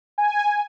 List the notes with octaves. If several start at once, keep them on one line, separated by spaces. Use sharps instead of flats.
G#5